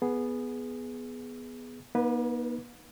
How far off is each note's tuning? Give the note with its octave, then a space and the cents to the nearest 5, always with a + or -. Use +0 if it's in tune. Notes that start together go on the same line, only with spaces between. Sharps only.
B3 -5 G#4 +5
A#3 +45 D#4 +0 B4 +0